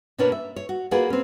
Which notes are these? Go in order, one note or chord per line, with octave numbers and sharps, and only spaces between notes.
B2 A#3 C#4 D4 B4 C#5
E5
C#5
F#4
A#3 F4 F#4 G#4 B4
C4 C#4